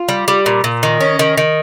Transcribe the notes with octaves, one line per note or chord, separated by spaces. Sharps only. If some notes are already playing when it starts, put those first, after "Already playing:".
Already playing: F4
G3
G3
A#2
A#2
D#3
C#4
D#3
D#3